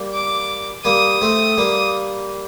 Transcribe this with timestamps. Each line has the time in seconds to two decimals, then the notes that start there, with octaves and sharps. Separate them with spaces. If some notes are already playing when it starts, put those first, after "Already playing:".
Already playing: G3 A#3
0.14 D6
0.85 G3 A#3 D#6
1.21 A3 C4
1.57 G3 A#3